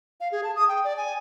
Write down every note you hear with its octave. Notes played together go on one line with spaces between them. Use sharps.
F5
G#4
A5
D#6
G5
D5
G#5